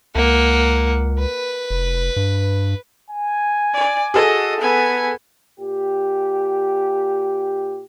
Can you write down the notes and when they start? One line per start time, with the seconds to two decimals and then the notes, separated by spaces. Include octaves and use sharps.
0.15 C#2 A#3 F#5
1.19 B4
1.70 F1
2.16 G2
3.11 G#5
3.73 D5
4.14 F#4 G#4 A4 D#5
4.60 B3 G#5
5.60 A#2 G4